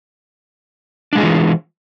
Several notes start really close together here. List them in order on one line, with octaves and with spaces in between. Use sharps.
D4 G#3 G#4 F4 E3